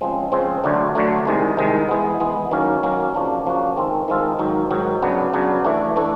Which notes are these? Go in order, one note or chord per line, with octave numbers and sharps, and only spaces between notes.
C#3 F3 G#3 C4
C#3 F3 G#3 C4
D2 D3 F#3 A3 D4
D2 D3 F#3 A3 D4
C2 C3 D#3 G#3
C2 C3 D#3 G#3
E3 G#3 B3
E3 G#3 B3
D#3 F#3 A#3 C#4
D#3 F#3 A#3 C#4
C#3 F3 A#3 D4 F#4
C#3 F3 A#3 D4 F#4
D#3 G#3 C4 F4 A4
D#3 G#3 C4 F4 A4
G#2 D#3 F#3
G#2 D#3 F#3
C#3 F#3 B3 D4
C#3 F#3 B3 D4
E3 A3 D4
E3 A3 D4